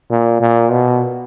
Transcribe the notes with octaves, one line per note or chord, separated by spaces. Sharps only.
A#2
A#2
B2